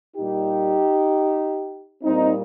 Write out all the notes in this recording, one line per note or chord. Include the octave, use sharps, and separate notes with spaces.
A#2 G3 D#4 G4
A#2 G3 C4 D#4